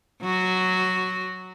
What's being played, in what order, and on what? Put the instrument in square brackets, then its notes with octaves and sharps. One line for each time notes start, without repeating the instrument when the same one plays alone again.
[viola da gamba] F#3 F#4